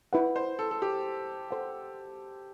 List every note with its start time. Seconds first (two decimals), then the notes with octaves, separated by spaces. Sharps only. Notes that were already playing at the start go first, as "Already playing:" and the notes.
0.13 E4 B4 F#5
0.36 C5
0.59 A4
0.71 A4
0.82 G4
1.51 A4 C5 F#5